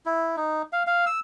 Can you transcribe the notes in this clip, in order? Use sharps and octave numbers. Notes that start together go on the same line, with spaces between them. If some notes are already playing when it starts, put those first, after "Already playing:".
E4
D#4
F5
F5
E6